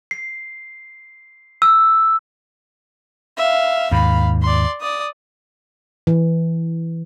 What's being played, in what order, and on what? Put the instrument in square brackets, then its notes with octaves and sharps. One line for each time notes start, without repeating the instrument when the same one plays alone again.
[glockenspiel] C7
E6
[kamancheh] E5 F5
[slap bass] D#2 G#2 [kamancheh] F5 B5
[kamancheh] D5 C6
D5 D#6
[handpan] E3